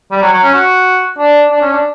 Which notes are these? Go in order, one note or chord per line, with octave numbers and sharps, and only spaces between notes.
G3
F#3
F#3
C#4
F#4
D4
D4
C#4
D4